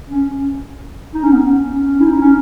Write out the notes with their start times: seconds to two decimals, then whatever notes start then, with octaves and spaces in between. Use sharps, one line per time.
0.09 C#4
1.14 D#4
1.23 C#4
1.32 B3
1.41 C#4
2.00 E4
2.05 D#4
2.21 C#4